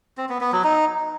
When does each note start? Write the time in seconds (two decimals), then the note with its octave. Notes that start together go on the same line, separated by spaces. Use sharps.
0.17 C4
0.29 B3
0.41 B3
0.52 F#3
0.64 D#4